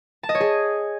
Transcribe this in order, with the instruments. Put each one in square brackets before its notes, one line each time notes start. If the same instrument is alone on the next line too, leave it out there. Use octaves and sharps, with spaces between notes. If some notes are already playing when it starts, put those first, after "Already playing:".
[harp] A5
D#5
C#5
G#4